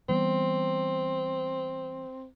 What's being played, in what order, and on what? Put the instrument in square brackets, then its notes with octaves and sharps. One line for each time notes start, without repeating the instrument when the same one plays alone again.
[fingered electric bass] E3 G3 B3 [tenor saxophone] C4